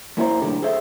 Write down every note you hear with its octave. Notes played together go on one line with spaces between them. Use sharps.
F2 A#3 E4 C5 A#5
B1 A2 D3 G4 A#4
G#4 A4 C5 E5